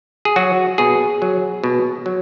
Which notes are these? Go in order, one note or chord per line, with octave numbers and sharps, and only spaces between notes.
G#4
F#3 F#4
B2 G#4
F#3
B2
F#3